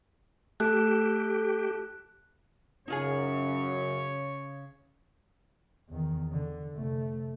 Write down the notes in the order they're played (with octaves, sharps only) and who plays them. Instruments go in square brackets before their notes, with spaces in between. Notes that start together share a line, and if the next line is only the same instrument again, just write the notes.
[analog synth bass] A3 [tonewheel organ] G4 [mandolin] A4 [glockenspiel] F#6
[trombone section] F#2 [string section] C#3 [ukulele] D#4 F4 G#4 [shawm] C#5
[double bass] E2 D#3
D3
F1 A3